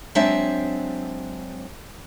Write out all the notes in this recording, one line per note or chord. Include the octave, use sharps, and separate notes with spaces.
F#3 G#3 C4 D4 E5 A5